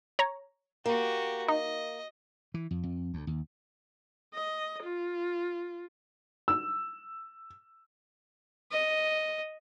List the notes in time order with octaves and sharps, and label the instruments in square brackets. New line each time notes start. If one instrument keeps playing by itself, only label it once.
[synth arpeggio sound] C#5 A#5
[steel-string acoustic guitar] A#3 [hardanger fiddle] F#4 G4
[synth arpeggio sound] D#4 [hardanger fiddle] D#5
[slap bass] E3
F2
F2
D2
D#2
[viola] D#5
F4
[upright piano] E6
[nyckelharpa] D#5